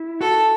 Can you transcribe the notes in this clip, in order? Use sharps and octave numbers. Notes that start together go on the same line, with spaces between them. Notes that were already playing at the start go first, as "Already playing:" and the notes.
Already playing: E4
F#4 A4